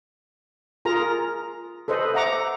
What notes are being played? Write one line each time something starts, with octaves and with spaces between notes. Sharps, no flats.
F4 G#4 A#4 A#5
A4 B4 C5 D#5
E5 F#5 A#5 D6